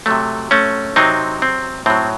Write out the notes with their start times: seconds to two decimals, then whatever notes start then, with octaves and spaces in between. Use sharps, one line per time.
0.06 C3 F#3 A3
0.51 A3 C#4
0.96 C3 F#3 C4 D#4
1.42 C4
1.86 A2 F#3 C4